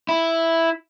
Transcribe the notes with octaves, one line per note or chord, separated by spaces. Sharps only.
E4